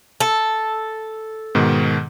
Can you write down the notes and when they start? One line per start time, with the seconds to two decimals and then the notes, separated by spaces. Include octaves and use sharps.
0.20 A4
1.55 G#2 B2 D#3